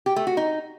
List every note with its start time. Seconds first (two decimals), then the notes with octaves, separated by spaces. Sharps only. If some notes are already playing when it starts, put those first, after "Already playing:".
0.06 G4
0.16 A3
0.27 F#4
0.37 D#4